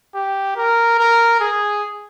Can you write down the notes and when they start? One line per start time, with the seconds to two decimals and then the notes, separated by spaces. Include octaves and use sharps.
0.15 G4
0.56 A#4
0.99 A#4
1.40 G#4